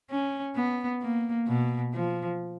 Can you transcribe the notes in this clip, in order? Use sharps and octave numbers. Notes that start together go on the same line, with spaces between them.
C#4
B3
A#3
B2
F3